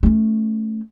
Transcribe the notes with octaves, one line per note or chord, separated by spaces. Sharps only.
A3 C#4